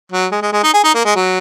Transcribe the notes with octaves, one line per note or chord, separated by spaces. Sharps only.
F#3
G#3
G#3
G#3
D#4
G#4
D#4
A#3
G#3
F#3